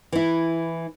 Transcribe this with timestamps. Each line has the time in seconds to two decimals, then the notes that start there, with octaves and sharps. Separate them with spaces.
0.12 E3 E4